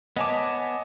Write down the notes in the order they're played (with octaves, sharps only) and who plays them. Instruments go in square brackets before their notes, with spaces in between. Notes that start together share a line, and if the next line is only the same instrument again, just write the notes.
[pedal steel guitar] B3 C#5 A5 [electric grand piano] D#5 G#5 D6